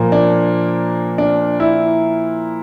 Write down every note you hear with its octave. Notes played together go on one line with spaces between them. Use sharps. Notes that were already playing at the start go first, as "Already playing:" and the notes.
Already playing: A#2 F3 A#3
D4
D4
E4